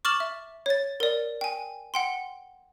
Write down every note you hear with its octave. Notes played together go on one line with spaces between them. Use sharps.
C#6 D6 F6 A6 E7 F#7
E5
C#5 A6
A#4 D5
G5 G#5
F#5 G5 C6